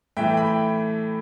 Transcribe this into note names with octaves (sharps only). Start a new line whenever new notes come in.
A2 E3 A3 E5 G5
G5 B5